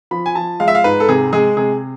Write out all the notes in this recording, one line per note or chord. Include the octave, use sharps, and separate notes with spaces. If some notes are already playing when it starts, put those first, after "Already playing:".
F3 B5
G#5
F3 A5
G#3 F5
E5
F5
G#2 B4
A4
C3 G#4
G#3 G#4
C3 G#4